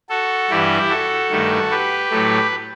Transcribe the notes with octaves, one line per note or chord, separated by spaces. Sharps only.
F#4 A4
G2 E3 G3 E4 G4
F#4 A4
G2 D#3 A3
G4 B4
A2 F#3 A3